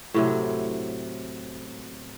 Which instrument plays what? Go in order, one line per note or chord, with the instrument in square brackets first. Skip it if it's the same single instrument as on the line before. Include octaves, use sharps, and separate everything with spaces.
[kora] A2 C3 F#3